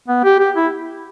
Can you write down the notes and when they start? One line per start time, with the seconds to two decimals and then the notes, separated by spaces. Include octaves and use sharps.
0.08 B3
0.24 G4
0.39 G4
0.56 E4